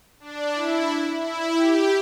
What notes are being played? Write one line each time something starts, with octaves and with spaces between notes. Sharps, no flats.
D4
E4
E4
G4